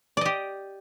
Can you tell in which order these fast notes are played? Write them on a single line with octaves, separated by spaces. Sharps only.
D5 D#5 G4